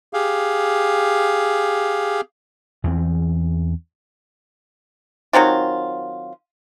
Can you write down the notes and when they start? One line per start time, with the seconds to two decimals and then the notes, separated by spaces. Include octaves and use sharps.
0.13 G4 G#4 F5
2.84 E2 E3 F3 C4
5.33 D#3 F#3 C4 F4